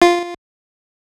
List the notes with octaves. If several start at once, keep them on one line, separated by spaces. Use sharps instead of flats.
F4